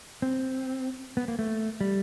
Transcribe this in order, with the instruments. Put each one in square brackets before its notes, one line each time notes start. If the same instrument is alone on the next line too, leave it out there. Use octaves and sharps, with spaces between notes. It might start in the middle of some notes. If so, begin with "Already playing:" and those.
[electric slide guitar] C4
B3
A#3
A3
G3